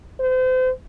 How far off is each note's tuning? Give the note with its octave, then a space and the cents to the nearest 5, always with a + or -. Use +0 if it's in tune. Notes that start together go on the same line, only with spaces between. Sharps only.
C5 -35